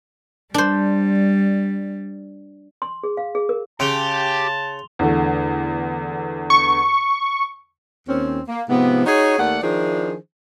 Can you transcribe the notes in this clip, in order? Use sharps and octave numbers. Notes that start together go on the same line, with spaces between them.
G3 D4 C5
C6
G#4
F5
G#4
A#4
C#3 G4 A5 C6 F7 G7
E2 D3 A3
C#6
D#2 C4 C#4
A#3
G#2 C3 F3 B3
D#4 F#4 G#4 C#5
D#2 A3 D5 F#5
D#3 F3 D4 E4 G#4 C5